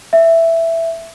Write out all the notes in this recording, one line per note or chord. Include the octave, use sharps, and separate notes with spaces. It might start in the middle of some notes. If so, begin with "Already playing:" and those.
E5